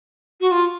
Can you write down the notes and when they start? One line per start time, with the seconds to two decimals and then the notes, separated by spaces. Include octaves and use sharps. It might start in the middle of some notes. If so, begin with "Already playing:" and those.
0.41 F#4
0.51 F4